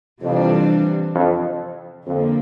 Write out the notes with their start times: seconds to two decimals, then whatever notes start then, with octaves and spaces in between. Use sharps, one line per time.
0.22 F2 C3 E3 G3 D4
1.15 F2
2.07 F2 D3 F3 A#3